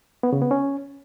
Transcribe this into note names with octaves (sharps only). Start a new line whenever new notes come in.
B3
C#3
B3
C#4